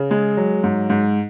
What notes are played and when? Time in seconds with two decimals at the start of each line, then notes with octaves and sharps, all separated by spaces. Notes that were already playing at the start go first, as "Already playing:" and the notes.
Already playing: C#3
0.11 G#3
0.37 F#3
0.64 G#2
0.90 G#2